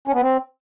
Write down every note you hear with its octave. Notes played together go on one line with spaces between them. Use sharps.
C#4
B3
C4